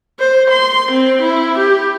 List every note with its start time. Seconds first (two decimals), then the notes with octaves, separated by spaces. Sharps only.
0.20 C5
0.51 C6
0.92 C4
1.23 E4
1.58 G4